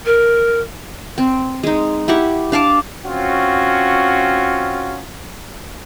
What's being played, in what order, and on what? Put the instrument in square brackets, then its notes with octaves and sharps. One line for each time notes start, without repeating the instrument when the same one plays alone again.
[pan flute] A#4
[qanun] C4
G#3 D#4
E4 G4 F#5 C#6
D4 F5 A5 D6
[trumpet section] C4 C#4 F4 F#4